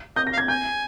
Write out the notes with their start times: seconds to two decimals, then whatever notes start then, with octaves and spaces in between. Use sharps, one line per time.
0.16 D#5 G6
0.27 A#6
0.33 F5
0.38 G#6
0.48 G#5 G6